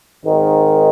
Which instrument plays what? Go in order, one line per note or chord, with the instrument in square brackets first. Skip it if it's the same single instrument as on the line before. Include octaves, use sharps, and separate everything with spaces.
[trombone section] G#1 G#2 D#3